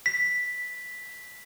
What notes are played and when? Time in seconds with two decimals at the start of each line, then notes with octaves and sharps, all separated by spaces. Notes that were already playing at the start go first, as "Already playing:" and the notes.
0.06 B6